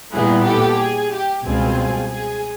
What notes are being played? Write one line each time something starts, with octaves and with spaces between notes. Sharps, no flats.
A#2 G3 B3 E4 G#4
G4 A4
G#4
G4
C#2 B2 G3 C4 F4 G#4
G#4